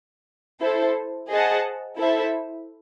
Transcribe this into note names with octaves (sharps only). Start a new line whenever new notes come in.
E4 A4 C5
G#4 C5 D#5 F#5 A5
E4 A4 C5 E5